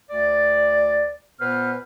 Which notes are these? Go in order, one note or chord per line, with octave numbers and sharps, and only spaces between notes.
D2 D5
A#2 B3 B4 C5 F6